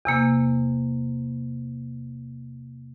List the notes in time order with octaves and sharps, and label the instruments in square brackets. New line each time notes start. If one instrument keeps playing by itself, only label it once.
[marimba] E2 C3 A#3